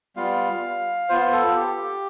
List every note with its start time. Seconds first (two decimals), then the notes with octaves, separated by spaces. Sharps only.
0.16 G3 B3 F4 F5
1.09 B3 F4 C5
1.33 A4
1.55 G4